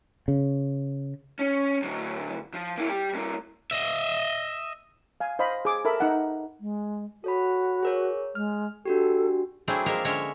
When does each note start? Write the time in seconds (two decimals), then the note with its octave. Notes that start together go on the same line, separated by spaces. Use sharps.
0.28 C#3
1.39 C#4
1.82 D2 F#3
2.54 F3
2.78 A#3 E4
2.89 G3 G4
3.13 G2 A#3
3.71 D#5 E5
5.20 F5 G#5
5.39 C5 D#5 F5 B5
5.65 G#4 D6
5.85 A4 A#4 E5 B5
6.00 D#4 F#5
6.60 G#3
7.24 F#4 A4 C#5 B5
7.83 G#4 A#4 C#5
8.35 G#3 F6
8.85 D4 F#4 G4 A4
9.68 F#3 A3 C4 D4 E4 G#4
9.86 F3 G#3 A#3 A#4 E5 F5
10.05 D3 G#3 C#4 A#4 C#5 E5